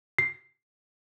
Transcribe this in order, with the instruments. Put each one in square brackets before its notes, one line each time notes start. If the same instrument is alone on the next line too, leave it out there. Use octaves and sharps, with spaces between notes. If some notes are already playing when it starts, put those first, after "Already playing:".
[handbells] C7